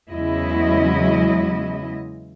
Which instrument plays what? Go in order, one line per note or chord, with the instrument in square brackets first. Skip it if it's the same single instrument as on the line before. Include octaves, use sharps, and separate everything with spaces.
[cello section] E2 C#3 F#3 G#3 E4 D#5